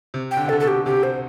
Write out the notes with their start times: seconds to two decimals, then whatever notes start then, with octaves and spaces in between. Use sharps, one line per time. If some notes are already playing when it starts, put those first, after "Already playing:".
0.14 C3
0.31 G5
0.37 D3
0.45 C3
0.49 A4
0.52 D3
0.60 B2 A4
0.67 G4
0.85 C3 G4
1.03 C5